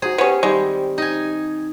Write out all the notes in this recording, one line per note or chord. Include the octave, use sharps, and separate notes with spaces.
D#4 F#4 G#4 C5
B3 C#4 G4 C5
D#3 G3 G#3 C4
D#4 G#5